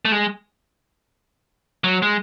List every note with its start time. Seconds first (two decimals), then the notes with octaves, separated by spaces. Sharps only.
0.05 A3
0.12 G#3
1.84 F#3
2.02 G#3